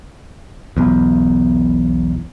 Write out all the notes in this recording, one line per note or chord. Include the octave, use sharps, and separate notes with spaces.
B1 E2